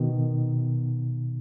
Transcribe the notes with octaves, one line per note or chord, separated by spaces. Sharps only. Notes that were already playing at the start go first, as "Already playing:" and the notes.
Already playing: B2 D#3